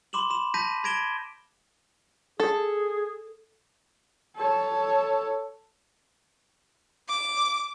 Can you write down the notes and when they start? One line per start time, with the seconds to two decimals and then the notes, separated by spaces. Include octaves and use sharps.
0.13 B5 C6 D6 E7 F#7
0.30 B5 E7
0.54 A5 B5 G6 A#6 B6 D#7
0.84 B5 G#6 A#6 D7 E7 G7
2.40 G#4 A4
4.36 A4 C#5
7.09 D6